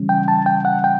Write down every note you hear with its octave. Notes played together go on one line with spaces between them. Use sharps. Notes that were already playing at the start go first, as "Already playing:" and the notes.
Already playing: C#3 E3 G3 C#4
G5
A5
G5
F#5
G5